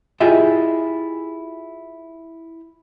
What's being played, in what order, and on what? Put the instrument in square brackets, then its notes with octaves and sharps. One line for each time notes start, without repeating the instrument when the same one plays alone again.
[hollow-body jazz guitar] E4 F4 G4 G#4 D#5 E5